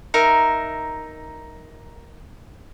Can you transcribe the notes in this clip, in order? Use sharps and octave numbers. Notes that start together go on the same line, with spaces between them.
D#4 A#4 E5